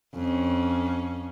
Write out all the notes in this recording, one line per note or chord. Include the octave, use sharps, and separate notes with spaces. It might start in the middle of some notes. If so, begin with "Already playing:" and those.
F2 C#4